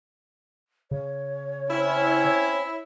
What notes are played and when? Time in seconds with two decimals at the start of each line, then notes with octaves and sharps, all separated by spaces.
0.91 C#3 C#5
1.70 C4 C#4 E4